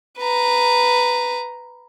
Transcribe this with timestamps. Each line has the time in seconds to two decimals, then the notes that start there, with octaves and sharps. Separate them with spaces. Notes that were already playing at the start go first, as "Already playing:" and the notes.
0.18 B4 A#5